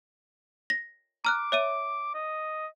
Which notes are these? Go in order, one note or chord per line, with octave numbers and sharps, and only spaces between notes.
A#6
A#5 D6 F6 F#6
C#5 E5 D#7
D#5